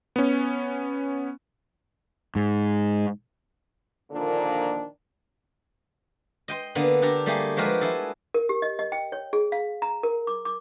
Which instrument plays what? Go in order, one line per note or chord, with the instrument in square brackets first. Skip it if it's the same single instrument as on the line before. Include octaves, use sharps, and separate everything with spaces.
[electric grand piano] B3 C#4
[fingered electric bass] G#2
[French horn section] A#2 D3 D#3 F3 A#3 D4
[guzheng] D#5 G5 C6
D3 A#3 B3
D4 G4 A4 A#5
G3 A3 A#3 G4 G#4
F3 G#3 F#4 G4 A#4 B4
E4 G#4 A4
[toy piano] A#4
G4
D#5
D#5
G5
C#5
G#4
F5
A#5
A#4
D6
D6